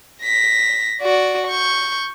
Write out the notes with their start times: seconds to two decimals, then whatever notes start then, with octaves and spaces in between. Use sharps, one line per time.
0.23 A#6 B6
1.01 F#4 D5
1.47 C#6 G6